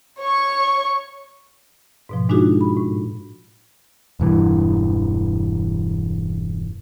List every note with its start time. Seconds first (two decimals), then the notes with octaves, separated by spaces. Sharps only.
0.19 C#5 C#6
2.09 G#2 B2 F3
2.29 G#3 D4 D#4 F4 F#4 G#4
2.61 B5
2.77 A2
4.20 E1 G2 E3